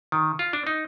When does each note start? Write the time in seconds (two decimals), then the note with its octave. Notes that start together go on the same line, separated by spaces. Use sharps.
0.12 D#3
0.39 F4
0.53 D4
0.67 D#4